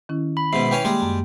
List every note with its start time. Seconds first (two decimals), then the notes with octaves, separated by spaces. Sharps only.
0.09 D#3 C#4 E4
0.37 B5
0.53 G#2 B2 E5 C7
0.71 E3 C#4 G5
0.84 G3 G#3 A#3
1.02 F#2